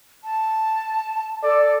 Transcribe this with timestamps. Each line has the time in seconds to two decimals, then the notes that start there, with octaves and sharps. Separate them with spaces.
0.24 A5
1.44 A4 D5